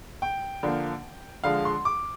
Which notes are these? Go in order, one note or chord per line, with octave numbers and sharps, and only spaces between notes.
G5
D3 F3 A#3
D3 F3 G#3 F5
C6
D6